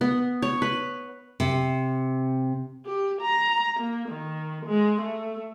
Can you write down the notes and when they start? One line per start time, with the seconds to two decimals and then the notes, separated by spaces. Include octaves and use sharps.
0.01 B3
0.42 C#5
0.62 B4
1.40 C3
2.85 G4
3.21 A#5
3.79 A#3
4.09 D#3
4.66 G#3
5.01 A3